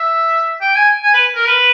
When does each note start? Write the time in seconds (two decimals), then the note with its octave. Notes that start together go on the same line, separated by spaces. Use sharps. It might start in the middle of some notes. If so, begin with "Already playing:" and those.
Already playing: E5
0.61 G5
0.76 G#5
1.03 G#5
1.14 B4
1.35 A#4
1.46 B4